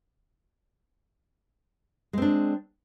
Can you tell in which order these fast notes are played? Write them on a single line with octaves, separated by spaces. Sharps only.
G#3 C4 D4